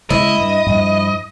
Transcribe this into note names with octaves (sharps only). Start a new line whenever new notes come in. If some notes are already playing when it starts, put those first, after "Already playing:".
C#3 G#3 E4 D#5
G2
G2 F3